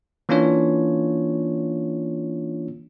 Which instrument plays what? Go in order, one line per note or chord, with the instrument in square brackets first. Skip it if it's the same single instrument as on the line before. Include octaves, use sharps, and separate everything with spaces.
[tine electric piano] E3 A#3 C#4 D4 F4 C#5